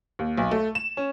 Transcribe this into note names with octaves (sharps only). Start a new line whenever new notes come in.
D#2
B1
A3
E7
C#4